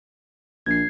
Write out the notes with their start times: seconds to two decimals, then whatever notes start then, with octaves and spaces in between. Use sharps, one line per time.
0.66 A#1 G#6 C7